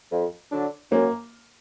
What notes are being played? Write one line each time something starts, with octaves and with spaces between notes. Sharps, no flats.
F2
D3 F#3 D4
F#2 A#3